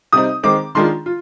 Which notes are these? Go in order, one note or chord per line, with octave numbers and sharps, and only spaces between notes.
C3 G3 C4 D#4 D#6
D#3 G#3 C4 D6
D#3 G#3 D4 F4 C6
F4